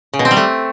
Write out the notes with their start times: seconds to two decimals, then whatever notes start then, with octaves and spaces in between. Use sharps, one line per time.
0.14 C#3
0.19 B2
0.25 C4
0.31 G3
0.37 A3